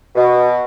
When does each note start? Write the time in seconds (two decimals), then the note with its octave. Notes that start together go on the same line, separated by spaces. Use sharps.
0.15 B2